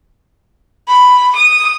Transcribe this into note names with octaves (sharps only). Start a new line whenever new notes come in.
B5
D#6